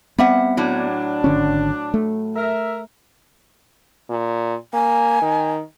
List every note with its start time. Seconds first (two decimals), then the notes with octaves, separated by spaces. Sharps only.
0.18 G3 B3 C4 E5 F#5
0.57 A2 F#3 D4
1.24 G#1 D3 C#4
1.94 A3
2.35 A#4 E5
4.09 A#2
4.73 A#3 G#5
5.22 D#3